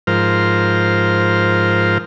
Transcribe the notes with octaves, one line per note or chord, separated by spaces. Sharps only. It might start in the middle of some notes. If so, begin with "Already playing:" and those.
G#2 F3 A#4 C5 F6